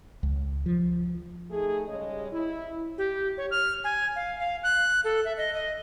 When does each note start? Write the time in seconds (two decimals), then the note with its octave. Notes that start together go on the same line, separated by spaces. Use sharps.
0.23 C#2
0.66 F3
1.51 A3 D#4 G#4
1.88 C#3 G3 G#3 C#5 D#5
2.33 E4
2.98 G4
3.38 C#5
3.51 F6
3.84 G#5
4.16 F5
4.40 F5
4.63 F#6
5.04 A4
5.25 E5
5.37 D#5
5.54 D#5